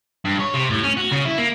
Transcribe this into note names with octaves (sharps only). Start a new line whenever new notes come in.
G2
C#5
C3
A2
C#4
F#4
C#3
E4
A#3